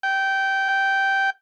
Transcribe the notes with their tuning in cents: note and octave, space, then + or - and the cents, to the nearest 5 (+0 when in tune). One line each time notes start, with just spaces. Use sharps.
G5 -15
G5 -10